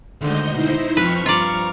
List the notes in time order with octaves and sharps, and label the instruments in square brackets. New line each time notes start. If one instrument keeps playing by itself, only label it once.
[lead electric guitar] D2 [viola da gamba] D3 D#3 G#3 [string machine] D#5 G6
[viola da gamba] B2 [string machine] D#4 E4 C5
[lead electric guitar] F2 [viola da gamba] F3 C4 [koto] B4 [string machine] C#6 F6
[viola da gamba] G2 F3 [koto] F4 D5 [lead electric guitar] A#5